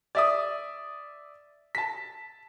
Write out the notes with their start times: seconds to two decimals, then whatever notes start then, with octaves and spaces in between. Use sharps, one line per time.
0.15 D5 E5 D#6
1.75 A5 B6